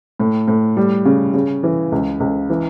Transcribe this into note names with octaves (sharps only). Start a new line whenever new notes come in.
A2
A2
G3
C#3
C#3
E3
C#2
C#2
E3